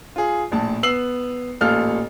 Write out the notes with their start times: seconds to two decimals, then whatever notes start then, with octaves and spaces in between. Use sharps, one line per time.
0.16 F4 G#4
0.52 A#1 A2 A5
0.83 B3 E6 C7 F#7
1.61 A1 A#2 A4 F5 F6